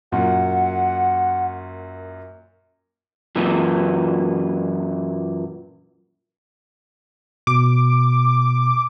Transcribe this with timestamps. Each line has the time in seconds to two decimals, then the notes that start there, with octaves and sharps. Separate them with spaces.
0.12 F#2 A#2 F#5
3.36 F#2 A#2 E3
7.47 B2 D6